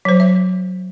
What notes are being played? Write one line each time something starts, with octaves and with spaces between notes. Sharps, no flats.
F#3 C5
E5